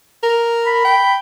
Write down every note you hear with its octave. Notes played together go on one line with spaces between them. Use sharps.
A#4
B5
G5